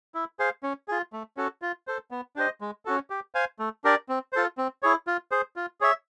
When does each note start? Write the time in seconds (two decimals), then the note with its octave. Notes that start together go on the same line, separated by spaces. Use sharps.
0.15 E4
0.39 G#4 C5 F5
0.63 C#4
0.88 F4 G#4
1.13 A3
1.37 C#4 F#4 A4
1.62 F4
1.87 A4 C5
2.11 B3
2.36 D4 G4 C5 D#5
2.61 G#3
2.85 C#4 F#4 A4
3.10 G4
3.35 C5 F5 G#5
3.59 A3
3.84 D4 G4 A#4 D5
4.09 C4
4.33 F4 A4 C5
4.58 C4
4.83 E4 G#4 C#5
5.07 F4
5.31 G#4 C5
5.56 F4
5.81 G#4 C#5 E5